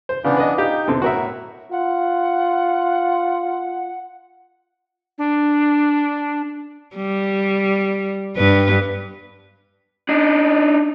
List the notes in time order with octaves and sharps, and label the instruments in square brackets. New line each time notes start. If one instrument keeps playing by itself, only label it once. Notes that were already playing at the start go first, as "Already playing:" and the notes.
[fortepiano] C5
[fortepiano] C#3 [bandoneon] E3 B3 D4
[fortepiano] B4 D#5
[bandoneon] D#4 [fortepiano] F4 G4
[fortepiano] E2 D3 C4
[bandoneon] A2 [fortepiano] F#4 A#4 E5
[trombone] F4 [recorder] F#5
[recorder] D4
[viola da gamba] G3
G2 B4
[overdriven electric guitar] D4 D#4